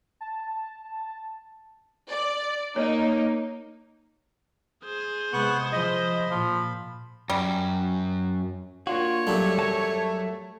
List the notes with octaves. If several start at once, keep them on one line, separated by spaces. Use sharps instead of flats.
A5
D5
A#3 D#4 C#5
G#4 C5
C3 G#3 B3 C#6 F#6
F3 D#5 B5
A#2 F3
F#2 G3
A#3 D4 F4 F#4 C#5
F#2 G3 A3
F#3 A5